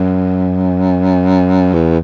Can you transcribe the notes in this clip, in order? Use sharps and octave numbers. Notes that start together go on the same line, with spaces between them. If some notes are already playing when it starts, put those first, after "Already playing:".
Already playing: F#2
E2